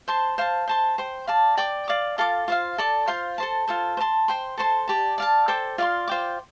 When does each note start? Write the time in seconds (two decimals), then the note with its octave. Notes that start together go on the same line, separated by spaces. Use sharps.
0.08 C5 A5 C6
0.38 C5 F5 A5
0.68 C5 A5 C6
0.98 C5 G5 C6
1.27 D5 F5 A5
1.57 D5 G5 D6
1.88 D5 F5 D6
2.18 F4 A4 F5 D6
2.48 F4 C5 F5
2.78 A4 D5 A5
3.08 F4 C5 F5 C6
3.38 A4 C5 A5
3.68 F4 A4 C5
3.97 C5 F5 A5 C6
4.28 C5 G5 C6
4.58 A4 C5 A5 C6
4.88 G4 D5 A5
5.18 D5 F5 A5
5.48 A4 C5 G5 D6
5.78 F4 D5 F5 C6
6.08 F4 C5 G5 D6